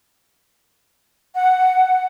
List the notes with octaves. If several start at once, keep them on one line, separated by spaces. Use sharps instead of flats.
F#5